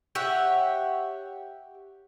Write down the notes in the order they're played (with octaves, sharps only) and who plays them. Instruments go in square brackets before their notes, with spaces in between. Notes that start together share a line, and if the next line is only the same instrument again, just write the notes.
[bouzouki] G4 C#5 E5 F#5